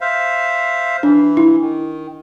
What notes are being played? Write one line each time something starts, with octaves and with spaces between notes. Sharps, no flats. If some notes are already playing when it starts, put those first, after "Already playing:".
C5 E5 F5
E3 D4
E4
D#3